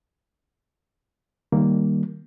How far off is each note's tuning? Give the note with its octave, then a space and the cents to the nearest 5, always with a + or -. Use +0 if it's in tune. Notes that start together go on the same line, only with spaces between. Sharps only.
D#3 -10 G3 -5 A#3 +0